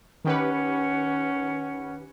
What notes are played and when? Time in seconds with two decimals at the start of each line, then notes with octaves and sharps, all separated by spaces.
0.25 D#3 C#4 G4 B4 F#5